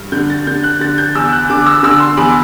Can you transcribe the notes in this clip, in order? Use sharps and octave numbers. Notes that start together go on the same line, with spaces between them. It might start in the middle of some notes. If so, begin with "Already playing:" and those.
Already playing: G2
D3 G6
A6
D3 G6
F#6
D3 A6
G6
E2 E6
F#6
D3 D6
E6
D3 E6
C6
E2 B5